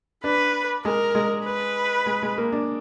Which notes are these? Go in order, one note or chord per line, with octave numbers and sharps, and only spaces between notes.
D4 B4
G#3 A#4
G#3
B4
G#3
G#3
A#3
D4